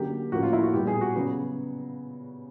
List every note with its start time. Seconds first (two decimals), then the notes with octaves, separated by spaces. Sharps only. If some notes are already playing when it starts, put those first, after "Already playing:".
Already playing: D3 F#3 A#3 C#4 G4
0.32 A2 F3 A#3 C#4 F#4
0.43 F4
0.53 E4
0.63 F#4
0.74 A#2 G3 B3 G4
0.87 G#4
1.01 F#4
1.15 C#3 F#3 B3